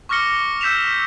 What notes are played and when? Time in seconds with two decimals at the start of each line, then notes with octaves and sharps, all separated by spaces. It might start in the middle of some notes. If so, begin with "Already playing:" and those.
0.09 C#6 D6 F6 A#6 C#7 G7
0.61 E6 G6 B6 E7 F7